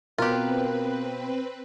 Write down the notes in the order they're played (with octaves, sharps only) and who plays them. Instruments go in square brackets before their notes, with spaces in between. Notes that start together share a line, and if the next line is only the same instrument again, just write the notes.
[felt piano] B2 [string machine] C4 B4 [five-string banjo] F4 G4 [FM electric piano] A#4 F#6